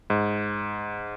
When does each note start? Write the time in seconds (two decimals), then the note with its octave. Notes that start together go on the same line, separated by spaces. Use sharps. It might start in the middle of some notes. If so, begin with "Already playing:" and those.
0.10 G#2